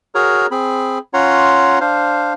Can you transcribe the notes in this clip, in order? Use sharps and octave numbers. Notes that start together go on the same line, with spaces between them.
F#4 G#4 A#4 C#5 A#5
C4 G#4 B5
C#4 F4 C#5 F#5 A#5 C6
D4 C5 F5